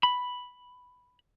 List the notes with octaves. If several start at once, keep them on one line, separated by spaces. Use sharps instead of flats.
B5